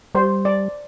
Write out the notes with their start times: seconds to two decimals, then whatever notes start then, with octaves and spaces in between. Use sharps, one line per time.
0.15 G3 C5
0.45 D5